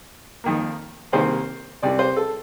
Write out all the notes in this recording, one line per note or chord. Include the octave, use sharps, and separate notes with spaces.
F2 D#3 A#3
C2 C3 D#3 A#3 C5
C2 C3 G3 C4 D5
C5
A4